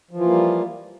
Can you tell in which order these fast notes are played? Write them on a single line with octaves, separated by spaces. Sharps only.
F3 E3 F4 A#3 G3